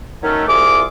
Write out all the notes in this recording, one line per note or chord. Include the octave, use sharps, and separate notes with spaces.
D#3 F#3 A3 C#4
C2 E4 F4 G#4 D6